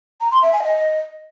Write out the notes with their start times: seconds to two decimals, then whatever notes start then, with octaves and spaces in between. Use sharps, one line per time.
0.21 A#5
0.31 C6
0.42 E5
0.53 G#5
0.63 D#5